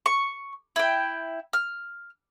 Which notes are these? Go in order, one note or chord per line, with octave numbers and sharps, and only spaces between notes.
C#6
E4 G5
F6